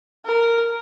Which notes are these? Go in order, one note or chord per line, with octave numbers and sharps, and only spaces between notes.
A#4